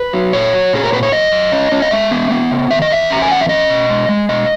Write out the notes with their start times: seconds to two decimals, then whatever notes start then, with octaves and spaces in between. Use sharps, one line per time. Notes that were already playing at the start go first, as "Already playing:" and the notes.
Already playing: B4
0.13 F#3
0.33 A#2 C#5
0.53 F#3
0.73 A#2 G#4
0.84 A#4
0.92 A#2 B4
1.03 C#5
1.12 F#2 D#5
1.32 F#2
1.52 C#4
1.72 C#4
1.82 D#5
1.91 G#3 E5
2.11 B3
2.31 B3
2.51 C#3
2.70 D#3 E5
2.82 D#5
2.91 E2 E5
3.10 C#4 A#5
3.22 G#5
3.30 E2 F#5
3.41 E5
3.49 C#4 D#5
3.69 B2
3.90 G#3
4.09 G#3
4.29 B2 D#5